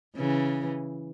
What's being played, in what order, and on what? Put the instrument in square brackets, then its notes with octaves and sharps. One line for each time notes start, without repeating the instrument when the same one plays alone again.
[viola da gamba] C#3 E3